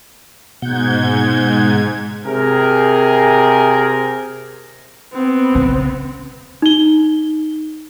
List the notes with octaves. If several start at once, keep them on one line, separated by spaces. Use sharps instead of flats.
G#2 B2 F#5 G6 G#6
C3 G#4 A#4
B3 C4
C#3
D#4 G7